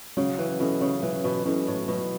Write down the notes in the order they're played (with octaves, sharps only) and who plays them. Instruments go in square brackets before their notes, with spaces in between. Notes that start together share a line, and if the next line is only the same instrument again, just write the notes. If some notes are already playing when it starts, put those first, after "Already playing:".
[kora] C#3 [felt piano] F#3
[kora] E3
[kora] B2 [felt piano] C#4 E4 A4
[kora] C#3
[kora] E3 [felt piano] F#3
[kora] B2
[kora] B2 [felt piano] C#4 E4 A4
[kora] A2
[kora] B2 [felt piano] F#3